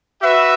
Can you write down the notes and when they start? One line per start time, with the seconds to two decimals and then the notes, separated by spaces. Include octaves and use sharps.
0.20 F#4 B4 E5